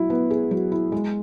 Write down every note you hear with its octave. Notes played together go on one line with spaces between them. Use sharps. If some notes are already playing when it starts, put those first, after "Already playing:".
Already playing: F#3 E4
B3
G#4
F#3
E4
G#3